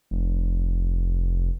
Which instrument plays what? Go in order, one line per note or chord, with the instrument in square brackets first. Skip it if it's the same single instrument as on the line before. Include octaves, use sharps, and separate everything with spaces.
[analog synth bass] F1